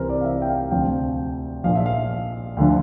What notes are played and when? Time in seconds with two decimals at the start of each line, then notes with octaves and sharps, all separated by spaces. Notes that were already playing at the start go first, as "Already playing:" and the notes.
Already playing: C2 C3 E3 A#4 C5
0.10 D5
0.21 F5
0.25 E5
0.42 G5
0.48 F5
0.71 D2 C3 F3 G5
1.64 A#1 A#2 F3 F5
1.75 E5
1.86 F5
2.57 D2 D3 F3